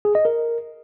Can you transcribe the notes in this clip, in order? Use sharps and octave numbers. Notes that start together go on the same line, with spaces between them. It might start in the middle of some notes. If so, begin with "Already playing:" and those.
G#4
D#5
A#4